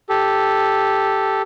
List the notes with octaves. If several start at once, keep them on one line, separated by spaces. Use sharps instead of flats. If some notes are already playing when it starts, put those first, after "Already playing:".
G4 A4